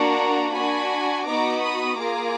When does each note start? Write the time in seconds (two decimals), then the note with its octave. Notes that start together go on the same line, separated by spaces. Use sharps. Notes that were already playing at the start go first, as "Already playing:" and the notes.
Already playing: A#3 D4 F#4 F#5 A#5
0.53 D4 F#4 G#5 B5
1.25 B3 D#4 F#4 A#5 D6
1.61 B5 D#6
1.97 A#3 F4 G#4 A#5 D6